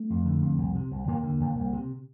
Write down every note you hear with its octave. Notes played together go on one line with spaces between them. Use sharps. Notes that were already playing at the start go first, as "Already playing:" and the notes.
Already playing: A3
F2
D3
F2
C2
C3
C2
D#2 A#3
D3
D#2
C2
C3